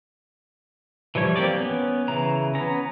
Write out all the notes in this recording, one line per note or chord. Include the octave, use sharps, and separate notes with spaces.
E3 F3 G3 C#5
E3 A#3 C4 G4 D5
B3 C#4
C#3 E3 A#5
B3 C#4 A#5